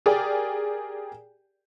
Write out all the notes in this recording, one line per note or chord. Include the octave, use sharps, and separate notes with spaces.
G4 G#4 A#4 D5 G5